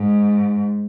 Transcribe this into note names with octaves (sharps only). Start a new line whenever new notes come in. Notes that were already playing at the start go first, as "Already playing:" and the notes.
Already playing: G#2